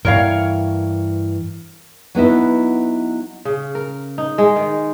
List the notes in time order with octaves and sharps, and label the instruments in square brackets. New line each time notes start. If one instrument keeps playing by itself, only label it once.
[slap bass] G2 E3 [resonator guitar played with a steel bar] A#4 C#5 F5
[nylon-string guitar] F#3 B3 D#4 E4
[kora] C#3
A#4
D#4
G#3
D#3